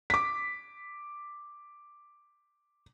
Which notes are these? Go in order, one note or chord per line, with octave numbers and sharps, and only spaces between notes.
D6 B6